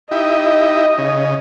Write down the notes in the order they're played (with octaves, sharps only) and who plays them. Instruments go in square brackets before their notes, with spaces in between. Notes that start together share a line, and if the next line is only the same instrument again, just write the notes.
[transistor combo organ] D#4 E4 G4 [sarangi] D#5
[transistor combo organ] C#3